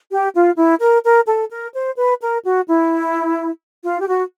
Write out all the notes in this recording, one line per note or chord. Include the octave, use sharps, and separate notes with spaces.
G4
F4
E4
A#4
A#4
A4
A#4
C5
B4
A#4
F#4
E4
F4
G4
F#4